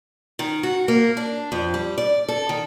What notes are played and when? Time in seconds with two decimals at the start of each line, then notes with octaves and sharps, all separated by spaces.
0.39 D#3
0.63 F#4
0.88 A#3
1.17 D4
1.52 F2
1.74 G3
1.98 D5
2.29 A4
2.49 D#3